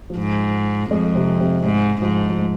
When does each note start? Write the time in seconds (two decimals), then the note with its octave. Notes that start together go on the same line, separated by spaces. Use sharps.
0.10 F3
0.18 G#2
0.91 F2 G#3
1.15 C3 C4
1.40 C3 C4
1.65 G#2 G#3
2.02 G#2 F3
2.29 F3
2.39 G#3